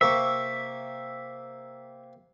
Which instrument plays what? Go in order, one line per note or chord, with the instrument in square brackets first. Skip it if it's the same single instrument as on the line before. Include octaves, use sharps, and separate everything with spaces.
[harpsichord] C3 A#3 C#6 [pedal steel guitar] E5